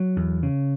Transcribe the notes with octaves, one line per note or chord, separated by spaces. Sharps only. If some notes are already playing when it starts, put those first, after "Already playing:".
Already playing: F#3
E2
C#3